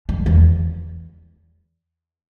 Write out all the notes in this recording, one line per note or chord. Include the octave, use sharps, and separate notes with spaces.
F2
E2